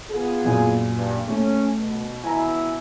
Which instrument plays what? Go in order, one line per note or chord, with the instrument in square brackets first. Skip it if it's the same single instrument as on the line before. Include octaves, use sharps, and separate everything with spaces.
[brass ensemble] B3 F4 G#4
[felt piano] F#2 A#2 G#5
[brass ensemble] G2
[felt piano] A3 [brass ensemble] C#4
[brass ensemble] B2
[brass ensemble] B2 E3 E4 [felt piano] G#5 A#5